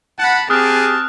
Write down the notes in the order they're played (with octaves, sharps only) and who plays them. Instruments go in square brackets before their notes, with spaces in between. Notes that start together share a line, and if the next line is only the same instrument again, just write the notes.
[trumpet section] F#5 [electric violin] A5 B5
[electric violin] C4 A5 [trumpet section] G4 G#4 [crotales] D#6 F6 F#6